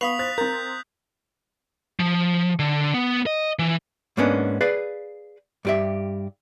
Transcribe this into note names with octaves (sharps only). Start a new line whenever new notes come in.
B3 F5 B5 C#6 D#6 B6 F7
C5 F#6 A6 B6
C4 A#4 A#5 G6
F3
D3
B3
D#5
E3
G#2 A#3 B3 C#4 D4
G#4 B4 D5 F5
G2 G4 E5